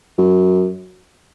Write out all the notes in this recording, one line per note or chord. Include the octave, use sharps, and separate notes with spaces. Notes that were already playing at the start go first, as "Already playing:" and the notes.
F#2